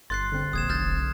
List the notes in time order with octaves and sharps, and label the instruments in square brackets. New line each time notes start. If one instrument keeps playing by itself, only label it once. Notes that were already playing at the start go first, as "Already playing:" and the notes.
[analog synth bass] G1 [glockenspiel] C6 F#6 C7 [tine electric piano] A6
[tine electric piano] D3 C4
[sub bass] D#1 [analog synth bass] A#1 [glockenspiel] D#6 G#6 E7
[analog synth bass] F1 [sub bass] B1 [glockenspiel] F6 G6 A6